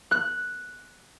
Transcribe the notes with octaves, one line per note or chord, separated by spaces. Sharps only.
F#6